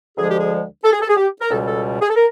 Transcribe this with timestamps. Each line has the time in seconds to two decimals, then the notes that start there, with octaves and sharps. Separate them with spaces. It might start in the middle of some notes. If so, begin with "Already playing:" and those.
0.17 D2 D3 F3 G#3 G#4
0.29 G4
0.39 G#4
0.84 A4
0.92 G#4
1.01 A4
1.09 G#4
1.17 G4
1.41 A#4
1.50 C#2 B2 G3 A4
1.67 A4
2.01 G#4
2.09 A4
2.16 A#4